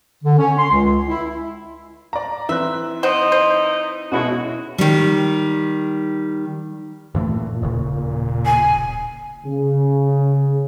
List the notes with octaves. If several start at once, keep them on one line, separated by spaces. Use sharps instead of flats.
D3
C#4
C6
C#2
E4
D5 A#5
E3 C4 E5 F#6
D#4 E4 C5 D#5 F#5
C5
B2 G#3 C#4 E4 F#4
D#3 G3
G2 A#2 E3 A3
D#1 A1 C#3
G#5
C#3